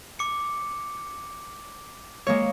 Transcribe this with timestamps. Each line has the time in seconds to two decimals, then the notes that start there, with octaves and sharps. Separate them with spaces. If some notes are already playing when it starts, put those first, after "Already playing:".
0.19 D6 C#7
2.27 G#3 A#3 C#5